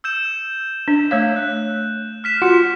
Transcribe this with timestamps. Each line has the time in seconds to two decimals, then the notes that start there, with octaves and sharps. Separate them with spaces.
0.04 E6 G6 E7
0.88 D4
1.11 A3 C#5 F5
1.36 F#6
2.24 F6 B6 E7
2.42 F4 F#4 F#5